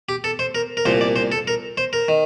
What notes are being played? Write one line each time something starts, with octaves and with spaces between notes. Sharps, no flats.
G4
A4
C5
A#4
A#4
C2 A#2 F3 C5
D5
C5
A4
A#4
C5
A#4
D#3